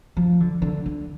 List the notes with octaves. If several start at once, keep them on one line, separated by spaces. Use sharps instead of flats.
F3
D3
D3
D3